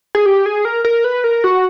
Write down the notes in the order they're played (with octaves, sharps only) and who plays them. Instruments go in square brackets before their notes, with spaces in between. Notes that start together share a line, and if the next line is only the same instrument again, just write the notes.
[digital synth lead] G#4
G4
G#4
A#4
A#4
B4
A#4
F#4